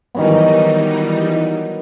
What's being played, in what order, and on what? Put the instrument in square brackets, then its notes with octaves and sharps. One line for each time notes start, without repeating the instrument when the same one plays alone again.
[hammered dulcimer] D#3 F#3 B3 [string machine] E3 G3 D#4